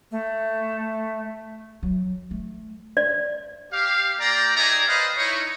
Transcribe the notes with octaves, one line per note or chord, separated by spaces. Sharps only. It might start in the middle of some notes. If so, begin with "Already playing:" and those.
A3
F#3
A3
D5
G4 F5
A#3 G4 D5 G5 A#5
D#4 G#4 D5 E5 G5 A#5
A4 B4 C5 D#5 F5
D#4 E4 C#5